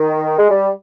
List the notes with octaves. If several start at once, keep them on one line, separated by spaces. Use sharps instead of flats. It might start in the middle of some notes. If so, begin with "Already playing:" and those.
Already playing: D#3
G#3
G3